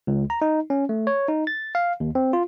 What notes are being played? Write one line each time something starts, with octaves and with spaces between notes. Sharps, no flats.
C#2
A#5
D#4
C#4
A3
C#5
D#4
A6
F5
D#2
C4
F4